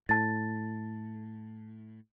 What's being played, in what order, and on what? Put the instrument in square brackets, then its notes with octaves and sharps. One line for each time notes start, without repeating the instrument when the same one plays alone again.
[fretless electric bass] A2 [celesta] A5 A6